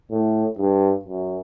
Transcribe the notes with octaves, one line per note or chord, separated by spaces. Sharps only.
A2
G2
F#2